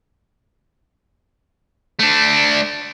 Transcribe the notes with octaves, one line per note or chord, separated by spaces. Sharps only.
A3 D4